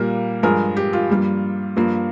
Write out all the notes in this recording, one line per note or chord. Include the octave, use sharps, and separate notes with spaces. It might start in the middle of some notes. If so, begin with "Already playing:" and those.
Already playing: A#2 G3 A#3 A#4
G2 F3 G#3 A#4
G4
F4
G2 G3 A#3
G2 F3 A#3